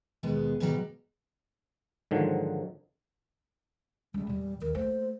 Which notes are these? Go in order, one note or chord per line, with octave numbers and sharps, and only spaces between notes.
D#2 B2 G#3 B3
G#2 B2 D#3 F#3 G3
G#2 D3 D#3 F3 F#3
C#2 G3
E2 A#2 G3
D#2 A#4
A3 A#3 C5